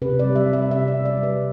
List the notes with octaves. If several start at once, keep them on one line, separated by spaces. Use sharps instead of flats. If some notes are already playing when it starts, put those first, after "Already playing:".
C3 B4
G3 D5
E5
G3
E5
C3 E5
D5
C3
D5
G3
B4